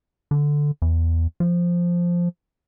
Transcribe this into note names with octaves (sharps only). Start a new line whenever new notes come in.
D3
E2
F3